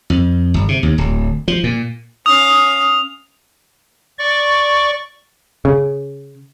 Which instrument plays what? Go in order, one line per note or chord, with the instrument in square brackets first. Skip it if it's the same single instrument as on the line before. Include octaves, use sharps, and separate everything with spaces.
[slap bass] F2
G1
C3
D#2
D1
F3
A#2
[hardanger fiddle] C#4 F5 [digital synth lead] D#6 [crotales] F7
[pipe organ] D5 C#6
[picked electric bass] C#3